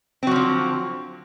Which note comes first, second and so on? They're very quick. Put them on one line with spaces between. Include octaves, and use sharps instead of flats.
C4 F#3 F3 D3